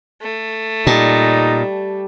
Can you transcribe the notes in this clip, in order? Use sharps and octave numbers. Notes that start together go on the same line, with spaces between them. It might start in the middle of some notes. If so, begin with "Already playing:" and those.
A3
A#2 G3 D#4 A5